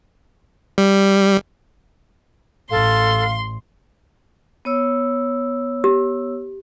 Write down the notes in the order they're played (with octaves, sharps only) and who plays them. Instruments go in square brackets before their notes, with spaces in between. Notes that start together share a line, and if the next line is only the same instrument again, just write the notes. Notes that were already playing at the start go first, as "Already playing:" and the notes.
[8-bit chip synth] G3
[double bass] A1 [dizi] A4 [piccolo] F5 [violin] C6
[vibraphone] B3 C#5 E6
[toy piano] G4